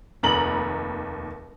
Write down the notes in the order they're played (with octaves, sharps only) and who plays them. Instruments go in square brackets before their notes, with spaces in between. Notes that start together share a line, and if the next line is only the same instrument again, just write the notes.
[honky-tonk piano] F1 D#2 A#5 B5 F#7